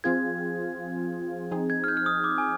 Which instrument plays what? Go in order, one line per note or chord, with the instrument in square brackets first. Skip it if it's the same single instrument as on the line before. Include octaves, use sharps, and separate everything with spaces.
[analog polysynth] F3 C4 F4 G#4 [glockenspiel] G#6
[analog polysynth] F3 C4 D#4 G#4
[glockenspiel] G#6
F6
G6
F6
D#6
D6
G#5